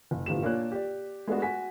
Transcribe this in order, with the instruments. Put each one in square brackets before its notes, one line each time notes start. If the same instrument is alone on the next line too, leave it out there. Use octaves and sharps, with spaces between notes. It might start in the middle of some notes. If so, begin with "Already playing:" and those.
[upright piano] F#1
G1 A2 F3 G4 E7
A#2 A#3 D4 F4 C#5 F#6
G4 D5
G#3 A3 B3 D4 F#4
F#4 G#5 B6